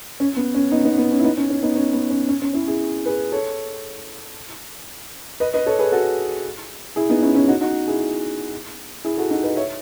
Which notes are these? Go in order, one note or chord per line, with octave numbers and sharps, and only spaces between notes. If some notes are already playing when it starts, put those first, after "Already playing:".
C#4
B3
C#4
B3 D#4
B3 D#4
B3
C#4
E4
B3 D#4
C#4
C#4
B3 D#4
C#4
B3
C#4
C#4
C#4
C#4 E4
E4 G#4
G#4 B4
A4 C#5
B4 D#5
B4 D#5
A4 C#5
G#4 B4
F#4 A4
E4 G#4
B3 D#4
C#4 E4
C#4 E4
D#4 F#4
D#4 F#4
E4 G#4
E4 G#4
F#4 A4
D#4 F#4
B4 D#5
C#5 E5